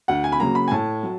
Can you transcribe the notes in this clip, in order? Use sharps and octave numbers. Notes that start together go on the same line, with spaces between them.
D2 F#5
G#5
B5
C#3 F#3 A#3 A#5
B5
G#5
A2 A5
F#3